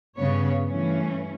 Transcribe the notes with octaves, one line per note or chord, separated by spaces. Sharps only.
G2 C#3 B3 C#5
G2 E3 A3 C#4